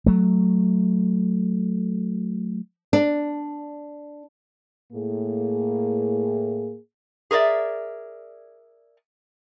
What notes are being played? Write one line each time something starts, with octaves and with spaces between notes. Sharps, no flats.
F#3 A3
D4
A2 A#3 G#4
G#4 A#4 C5 D5 E5